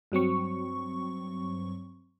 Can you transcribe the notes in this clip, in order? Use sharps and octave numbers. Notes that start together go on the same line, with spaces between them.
G2 F#3 C4 C#6